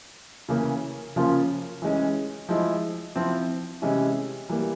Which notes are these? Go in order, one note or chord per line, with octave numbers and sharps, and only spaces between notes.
C#3 E3 A#3 C#4
C#3 F3 A#3 C#4 F4
E3 G#3 C#4
F3 G#3 E4
F3 C4 E4
C3 E3 G#3 C#4 E4
E3 G3 A#3